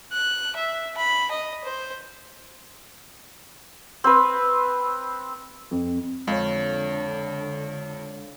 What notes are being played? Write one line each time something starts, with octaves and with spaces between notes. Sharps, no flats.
F#6
E5
B5
D#5
C5
C4 B4
F2
F2 D3 G#3 C#5 F5